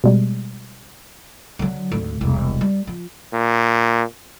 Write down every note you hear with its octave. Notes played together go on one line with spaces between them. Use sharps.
B2 G3 G#3
D3 F#3
G#1 D2
E1 C2
G3
F3
A#2